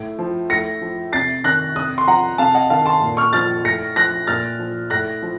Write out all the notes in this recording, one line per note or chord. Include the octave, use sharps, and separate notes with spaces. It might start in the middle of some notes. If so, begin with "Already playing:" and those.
Already playing: A2
F3
A2 A#6 C#7
F3
C3 A6 C7
D#3 F#6 A#6
C3 D#6 F#6
C6
F3 F#5 A#5
C3 F5 A5
D#5 F#5
D#3 F5 A5
A5 C6
A#2
C#6 F6
F3 F6 A6
A2 A#6 C#7
F3 F#6 A#6
A#2 F6 A6
F3
A2 F#6 A#6
F3